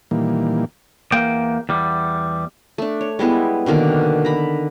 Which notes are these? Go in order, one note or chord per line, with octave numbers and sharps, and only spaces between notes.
A#2 D#3 E3 G3 A#3
E2 A#3 G5
E2 G3
A3 D4
C#5
G3 G#3 B3 E4
B2 D3 D#3 A#3
A#5 B5